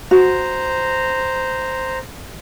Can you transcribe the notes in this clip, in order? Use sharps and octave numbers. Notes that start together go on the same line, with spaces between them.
F#4 C5 A#5